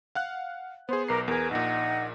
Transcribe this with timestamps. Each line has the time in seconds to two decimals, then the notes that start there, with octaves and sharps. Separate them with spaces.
0.15 F5 F#5 F#6
0.89 B3 G#4 C5
1.08 B1 A#4 B4 A#5 D6 C7
1.28 E2 G#4 A#4 B4
1.51 A#1 A#2 D#4 F#5